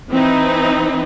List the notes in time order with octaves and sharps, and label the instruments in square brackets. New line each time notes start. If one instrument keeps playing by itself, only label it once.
[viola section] E3 C4 D#4